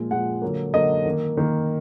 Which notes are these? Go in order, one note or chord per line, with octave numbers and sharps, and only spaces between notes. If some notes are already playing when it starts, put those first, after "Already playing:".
Already playing: A#2 F3 G#3
A#2 F3 G#3 F#5
D3 F#3 A#3
D3 F#3 A#3 D#5
D#3 A#3
D#3 A#3